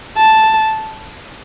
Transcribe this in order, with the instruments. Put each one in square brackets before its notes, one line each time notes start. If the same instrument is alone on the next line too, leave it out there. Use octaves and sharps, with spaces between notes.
[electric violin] A5